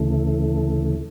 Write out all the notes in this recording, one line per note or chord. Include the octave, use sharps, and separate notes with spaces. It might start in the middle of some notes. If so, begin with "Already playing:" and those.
Already playing: D2 C#3 E3 A3